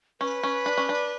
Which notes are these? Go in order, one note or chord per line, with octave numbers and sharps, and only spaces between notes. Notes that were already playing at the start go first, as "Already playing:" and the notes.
C#4 B4
C#4
D4
C#4
D4